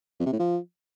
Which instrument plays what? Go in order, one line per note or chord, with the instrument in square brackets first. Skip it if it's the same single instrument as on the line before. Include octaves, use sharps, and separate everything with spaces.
[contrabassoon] F2
C3
A2
F3